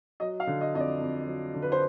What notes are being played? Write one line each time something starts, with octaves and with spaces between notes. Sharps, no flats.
F#3 D#5
F5
D3
D#5
F2 D#5
D5
F2
F#3
D3
B4
C5